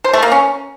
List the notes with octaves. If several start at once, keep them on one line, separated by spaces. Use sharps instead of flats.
C5
A3
A#3
C#4